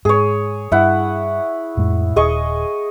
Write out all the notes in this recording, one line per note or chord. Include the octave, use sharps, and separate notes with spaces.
G#2 G#4 C#5
G2 E4 F#5
F2 A2 G#3
D#1 G#4 D#5 C#6